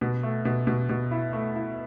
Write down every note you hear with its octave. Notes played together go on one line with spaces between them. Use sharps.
B2
A3
B2
B2
B2
E4
A3
E4